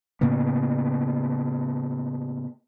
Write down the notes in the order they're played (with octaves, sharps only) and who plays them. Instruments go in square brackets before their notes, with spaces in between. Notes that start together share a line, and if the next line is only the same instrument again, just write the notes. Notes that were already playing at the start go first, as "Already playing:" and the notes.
[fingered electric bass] A2 C#3 A#3 B3